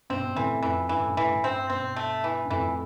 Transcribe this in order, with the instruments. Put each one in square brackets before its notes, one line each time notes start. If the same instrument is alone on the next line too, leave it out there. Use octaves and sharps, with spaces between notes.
[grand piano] G2 B2 [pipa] C4
[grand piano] B2
[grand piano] A2 C3 [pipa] E3
[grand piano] F2 [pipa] E3
[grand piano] G2 [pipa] E3
[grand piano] A2
G2
[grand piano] A2 [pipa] E3
[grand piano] G2
A2
[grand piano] G2 [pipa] C4
[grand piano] G2 B2 [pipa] C4
[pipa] A3
E3
[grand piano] G2
[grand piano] F2 A2 [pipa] E3